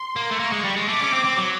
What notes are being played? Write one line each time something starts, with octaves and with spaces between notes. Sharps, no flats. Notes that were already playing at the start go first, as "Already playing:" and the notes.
Already playing: C6
A#3
A3
A#3 C#6
G#3
G3
G#3
A3 D6
C#4
C4
C4
F#3